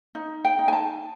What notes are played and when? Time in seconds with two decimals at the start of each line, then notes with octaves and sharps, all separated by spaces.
0.15 D#4
0.45 G5
0.59 D#4
0.68 G#5
0.73 A5